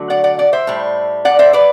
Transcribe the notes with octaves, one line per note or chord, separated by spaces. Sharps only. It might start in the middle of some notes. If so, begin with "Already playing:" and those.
Already playing: D3 F#3 A3
D5 F#5
D5 F#5
D5 F#5
C5 E5
A2 G3
D5 F#5
C5 E5
B4 D5